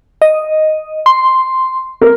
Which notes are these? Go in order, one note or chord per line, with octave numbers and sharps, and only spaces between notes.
D#5
C6
A#4